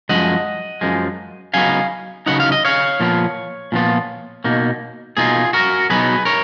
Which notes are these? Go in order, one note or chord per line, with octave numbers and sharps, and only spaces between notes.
F#2 F3 G#3 D#5 F#5
F#2 F3 G#3
C#3 F#3 B3 D#4 F5 G#5
C#3 F#3 B3 D#4 F#5
F5
D#5
C#5 F5
A#2 F3 B3 F4
A#2 F3 B3 F4
B2 A#3 D#4
B2 A#3 D#4 F4 G#4
F#4 A#4
B2 F#3 B3 D#4 G#4 B4
A#4 C#5